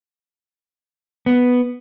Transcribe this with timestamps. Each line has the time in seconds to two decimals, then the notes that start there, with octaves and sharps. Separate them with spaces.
1.26 B3